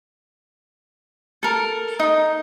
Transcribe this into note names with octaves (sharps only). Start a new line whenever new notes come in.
A4 A#4
D#4